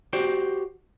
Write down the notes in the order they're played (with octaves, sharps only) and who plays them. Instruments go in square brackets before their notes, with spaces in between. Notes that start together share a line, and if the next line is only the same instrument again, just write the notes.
[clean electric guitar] F#4 G4 C5 D5